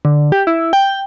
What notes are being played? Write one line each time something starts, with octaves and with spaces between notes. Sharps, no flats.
D3
G4
E4
G5